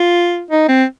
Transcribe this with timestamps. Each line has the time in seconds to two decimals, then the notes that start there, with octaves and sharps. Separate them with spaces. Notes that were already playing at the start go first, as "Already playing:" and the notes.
Already playing: F4
0.51 D#4
0.69 C4